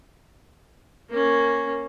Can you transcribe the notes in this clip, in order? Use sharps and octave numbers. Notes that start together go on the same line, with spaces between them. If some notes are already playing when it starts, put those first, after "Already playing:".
A#3 C#4